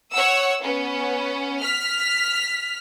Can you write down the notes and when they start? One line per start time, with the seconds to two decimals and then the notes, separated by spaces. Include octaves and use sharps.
0.14 C#5 F#5 E6
0.63 B3 C#4
1.62 F6 B6